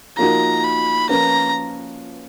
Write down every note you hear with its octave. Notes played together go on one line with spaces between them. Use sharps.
F3 A#3 D#4 F#4 A#5
B5
F3 A#3 C#4 F4 B4 A#5